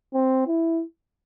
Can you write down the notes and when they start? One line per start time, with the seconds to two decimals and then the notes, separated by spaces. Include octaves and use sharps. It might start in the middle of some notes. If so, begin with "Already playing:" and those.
0.14 C4
0.47 E4